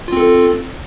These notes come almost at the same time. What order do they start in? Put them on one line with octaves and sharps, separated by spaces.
F4 C4 A4